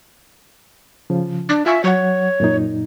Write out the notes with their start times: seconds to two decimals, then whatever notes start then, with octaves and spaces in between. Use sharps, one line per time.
1.10 C#3 F3
1.49 D4
1.66 F4 E5 G#5 C#6
1.84 F#3 C#5 F#5
2.40 F#2 A#2 D#4